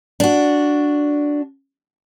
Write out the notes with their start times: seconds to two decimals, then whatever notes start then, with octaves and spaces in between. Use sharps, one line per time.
0.20 D4 F#4